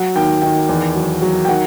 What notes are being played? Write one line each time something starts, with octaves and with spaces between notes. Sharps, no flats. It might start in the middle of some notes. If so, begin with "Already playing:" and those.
Already playing: F#3 F#5
D#2 G5
D#3 G5
E2
F#3
F#3
G5
D#3 F#5